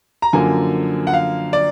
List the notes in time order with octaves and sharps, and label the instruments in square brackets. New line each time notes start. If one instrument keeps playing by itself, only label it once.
[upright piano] A#5
F#2 D3 F3 A#3 G#5
F#5
F5
D5